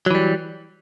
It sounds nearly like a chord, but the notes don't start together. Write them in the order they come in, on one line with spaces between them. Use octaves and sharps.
F#3 E3 G3